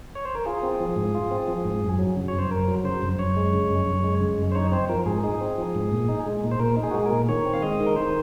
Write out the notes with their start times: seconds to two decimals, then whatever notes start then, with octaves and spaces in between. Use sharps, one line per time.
0.15 C#5
0.25 C5
0.35 A#4
0.46 F4 G#4
0.63 C4
0.80 F3
0.96 G#2
1.15 F4
1.31 C4
1.48 F3
1.65 G#2
1.83 F#2
1.99 F#3
2.16 C#3
2.28 C#5
2.33 F#2
2.39 C5
2.50 F#2 A#4
2.68 F#3
2.84 C#3 C5
3.02 F#2
3.19 F#2 C#5
3.36 G#3
3.53 C#3
3.70 F#2
3.87 F#2
4.04 G#3
4.21 C#3
4.38 F#2
4.52 C5
4.55 D#4 C#5
4.72 C4 C5
4.89 F3 A#4
5.06 G#2 G#4
5.24 D#4 G#4
5.41 C4
5.58 F3
5.75 G#2
5.92 A#2
6.09 D#4
6.26 G#3
6.43 A#2
6.51 C5
6.60 A#2 A#4
6.77 D#4
6.83 G#4
6.91 F#4
6.94 G#3 G#4
7.06 A#4
7.12 A#2
7.29 D#3 C#5
7.45 C4
7.54 F5
7.62 G#3 D#5
7.80 D#3
7.86 A#4
7.96 D#3 C5